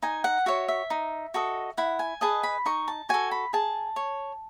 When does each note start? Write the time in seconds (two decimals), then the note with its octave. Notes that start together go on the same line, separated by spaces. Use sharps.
0.02 D#4 G#5
0.24 F#5
0.46 F#4 C#5 E5
0.68 E5
0.90 D#4
1.34 F#4 A4 D#5
1.77 E4 F#5
1.99 G#5
2.21 G#4 B4 D#5 A5
2.43 B5
2.66 D#4 C#6
2.88 A5
3.09 F#4 A4 G#5
3.31 B5
3.53 G#4 A5
3.96 C#5